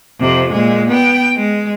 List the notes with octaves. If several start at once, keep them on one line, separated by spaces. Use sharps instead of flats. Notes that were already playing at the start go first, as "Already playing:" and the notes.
F2 C3
A#2 G#3
B3 G5
G#3